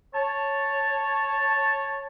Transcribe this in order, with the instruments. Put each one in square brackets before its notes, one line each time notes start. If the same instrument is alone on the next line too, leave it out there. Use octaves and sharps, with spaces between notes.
[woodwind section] C#5 A5